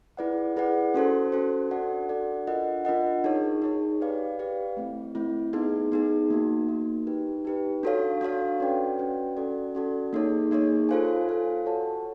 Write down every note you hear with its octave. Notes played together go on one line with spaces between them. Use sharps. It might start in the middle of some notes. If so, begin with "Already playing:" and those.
E4 G#4 B4 D5 F#5
E4 G#4 B4 D5 F#5
C#4 F#4 A4 C5
C#4 F#4 A4 C5
D4 F#4 A4 D5 F#5
D4 F#4 A4 D5 F#5
D4 F4 A#4 D#5 F#5
D4 F4 A#4 D#5 F#5
D#4 G#4 C#5
D#4 G#4 C#5
G4 B4 D5 F5
G4 B4 D5 F5
A3 C4 E4
A3 C4 E4
B3 D#4 G#4
B3 D#4 G#4
A#3 D#4 F#4
A#3 D#4 F#4
D#4 G4 B4
D#4 G4 B4
D4 F#4 A4 C#5 F5
D4 F#4 A4 C#5 F5
C#4 F#4 B4 D5 G5
C#4 F#4 B4 D5 G5
C#4 F#4 A4 D5
C#4 F#4 A4 D5
A#3 D#4 G#4 C#5
A#3 D#4 G#4 C#5
F4 A4 C5 F5 G#5
F4 A4 C5 F5 G#5
F#4 A4 C#5 F#5 A5